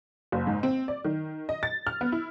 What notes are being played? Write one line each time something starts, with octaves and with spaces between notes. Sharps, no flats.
F#1
G#2
C4
D5
D#3
D#5
A6
F6
B3
E4